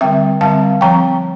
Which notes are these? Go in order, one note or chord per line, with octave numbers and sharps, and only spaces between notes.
D3 G3 C4 E5 G5
D3 G3 C4 F5 A5
F3 C4 G5 A#5